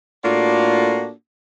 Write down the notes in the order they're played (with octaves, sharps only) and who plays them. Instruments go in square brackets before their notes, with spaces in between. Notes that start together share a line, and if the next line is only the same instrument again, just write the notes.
[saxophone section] A2 A#3 D4 F4 F#4 A4